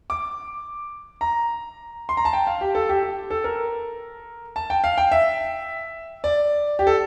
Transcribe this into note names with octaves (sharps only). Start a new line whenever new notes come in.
D6
A#5
C6
A#5
A5
G5
F5
G4
A4
G4
G4
A4
A#4
A5
G5
F5
G5
E5
D5
G4
A4